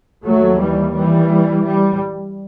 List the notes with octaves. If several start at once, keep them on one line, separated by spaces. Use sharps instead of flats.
D#2 F#3 A3
E3 G3
E3 G3
G3